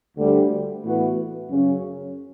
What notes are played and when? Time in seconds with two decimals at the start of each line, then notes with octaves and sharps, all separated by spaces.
0.18 D2 D3 G3
0.83 A2 E3 B3 F#4 B4
1.49 F#2 C#3 F#3 C#4